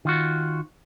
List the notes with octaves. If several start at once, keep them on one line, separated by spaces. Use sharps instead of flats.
D#3 F4 F#4